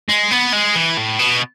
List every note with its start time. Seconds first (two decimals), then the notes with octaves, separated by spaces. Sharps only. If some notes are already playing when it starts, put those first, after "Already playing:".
0.09 G#3
0.31 B3
0.53 G#3
0.75 E3
0.97 A2
1.19 B2